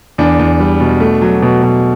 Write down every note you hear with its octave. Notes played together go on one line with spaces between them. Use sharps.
E2 D4
E2
G3
B2
A3
F#3
B2
B2